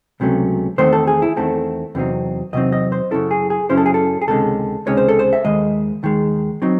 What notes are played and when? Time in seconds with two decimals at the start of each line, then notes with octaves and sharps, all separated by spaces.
0.20 C#2 C3 F#3 A3 C#4
0.78 E2 D#3 A3 C4 C5
0.92 A4
1.07 G#4
1.22 E4
1.37 E2 D#3 A3 C4 A4
1.95 E2 C3 F#3 C4 D#4
2.53 E2 C3 F#3 C4 D#4 D#5
2.72 D#5
2.92 C5
3.11 F#2 C#3 F#3 C#4 E4 A4
3.31 G#4
3.50 G#4
3.69 F#2 C#3 F#3 C#4 E4 C5
3.77 A4
3.86 G#4
3.94 A4
4.22 G#4
4.27 C#2 C3 D#3 G#3 C#4 A4
4.86 C#2 C3 D#3 G#3 C#4 C#5
4.97 C5
5.08 A4
5.19 C5
5.33 E5
5.45 D#2 D#3 G#3 D#5
6.03 D#2 D#3 G#3
6.62 F#3 C4 D#4